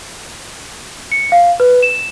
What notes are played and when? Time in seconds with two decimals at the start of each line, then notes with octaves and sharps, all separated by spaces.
1.12 C#7
1.32 F5
1.60 B4
1.83 E7